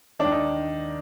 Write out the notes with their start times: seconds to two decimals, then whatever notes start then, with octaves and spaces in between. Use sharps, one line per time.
0.19 D#3 D4
0.25 D#2
0.32 D#4